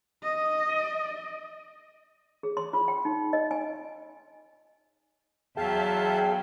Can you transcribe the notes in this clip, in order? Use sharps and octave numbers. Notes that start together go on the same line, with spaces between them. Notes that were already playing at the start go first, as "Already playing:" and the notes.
D#5
G#4
C6
F4
G5
D#4
D#5
G#5
E2 F#3 G#4 E5 F5 G5 A5